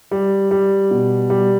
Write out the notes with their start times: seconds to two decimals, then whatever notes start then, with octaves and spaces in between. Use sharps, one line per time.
0.11 G3
0.51 G3
0.91 B2
1.30 G3